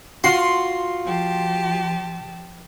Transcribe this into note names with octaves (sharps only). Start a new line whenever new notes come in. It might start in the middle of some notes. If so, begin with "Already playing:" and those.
F4 F#4 C6
F3 G4 A5